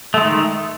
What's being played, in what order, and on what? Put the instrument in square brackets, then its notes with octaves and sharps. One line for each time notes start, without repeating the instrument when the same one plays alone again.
[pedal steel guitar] A3
G#3
D#3